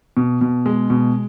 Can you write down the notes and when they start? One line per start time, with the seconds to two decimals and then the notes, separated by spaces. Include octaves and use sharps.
0.17 B2
0.41 B2
0.66 G#3
0.90 B2